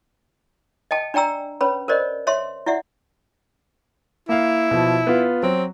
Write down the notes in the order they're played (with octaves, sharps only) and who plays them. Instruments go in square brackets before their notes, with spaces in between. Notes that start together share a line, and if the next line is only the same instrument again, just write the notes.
[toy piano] D#5 G5 A5
D4 D5 G5 A#5 E6
C#4 B4 C#5 B5
A#4 C5 D5 D#5
C#5 E5 C6
E4 D5 E5 F#5
[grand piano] A#3 F5 [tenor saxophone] E4
[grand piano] B2 F3
B3 F4
[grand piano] F#3 [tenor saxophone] C4